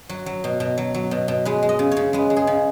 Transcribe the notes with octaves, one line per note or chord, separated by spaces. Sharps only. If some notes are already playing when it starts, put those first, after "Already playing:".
F#3 F#4
F#3
B2
B2
F#3
F#3
B2
B2
G#3 B4
G#3
D#5
C#3
C#5
C#3
G#3 B4
G#3
G#4
C#3